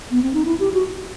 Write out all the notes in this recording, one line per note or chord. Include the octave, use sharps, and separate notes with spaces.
B3
C4
D#4
E4
G4
F#4